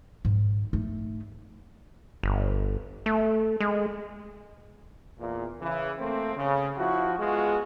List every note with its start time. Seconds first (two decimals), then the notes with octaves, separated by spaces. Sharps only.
0.25 G#2
0.73 A3 D#4
2.23 G1
3.06 A3
3.60 G#3
5.18 E2 A#2
5.61 C#3 E3
5.99 A3 A#3 C4
6.36 C#3
6.77 F3 E4 F#4
7.19 G#3 B3 F4 F#4 G#4